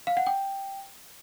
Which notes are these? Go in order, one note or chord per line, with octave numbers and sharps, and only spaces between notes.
F5
F#5
G5